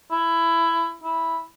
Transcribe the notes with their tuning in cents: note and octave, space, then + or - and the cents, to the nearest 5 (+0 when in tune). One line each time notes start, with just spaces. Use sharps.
E4 +15
E4 -10